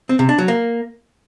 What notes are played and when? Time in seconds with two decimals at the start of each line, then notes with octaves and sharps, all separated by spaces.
0.09 C4
0.19 C3
0.29 D4
0.38 F#3
0.48 A#3